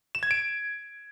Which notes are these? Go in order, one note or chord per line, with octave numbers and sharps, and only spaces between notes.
E7
G#6
D7